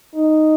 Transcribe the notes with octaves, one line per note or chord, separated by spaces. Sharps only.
D#4